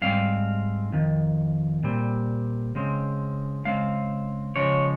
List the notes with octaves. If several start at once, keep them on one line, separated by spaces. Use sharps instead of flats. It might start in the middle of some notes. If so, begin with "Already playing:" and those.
G#2 G3 C4 F5
F2 D#3
A#2 G3 C4
C#3 G#3 C4
C#3 G#3 C4 F5
C#3 F3 G#3 C#5